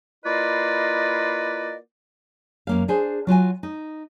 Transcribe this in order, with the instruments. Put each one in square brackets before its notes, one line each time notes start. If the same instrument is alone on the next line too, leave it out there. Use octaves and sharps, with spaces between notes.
[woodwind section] A#3 E4 F4 B4 D5 D#5
[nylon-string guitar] F#2 A#3 F5
D4 G#4 C5
F#3 F4 F#4 G#5
D#4